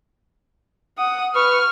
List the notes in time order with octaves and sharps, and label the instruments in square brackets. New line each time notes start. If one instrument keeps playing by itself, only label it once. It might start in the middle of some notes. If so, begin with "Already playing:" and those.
[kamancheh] F#5 D#6
[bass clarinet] B4 [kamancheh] C#6 [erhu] F6